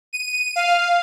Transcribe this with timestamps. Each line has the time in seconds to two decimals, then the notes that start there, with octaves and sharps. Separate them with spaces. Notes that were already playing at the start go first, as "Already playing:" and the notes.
0.13 D#7
0.56 F5